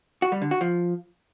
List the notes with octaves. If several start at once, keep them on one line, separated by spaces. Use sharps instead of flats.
F#4
G3
D3
F#4
F3